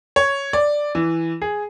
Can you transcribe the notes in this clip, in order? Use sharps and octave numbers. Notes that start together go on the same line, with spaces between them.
C#5
D5
E3
G#4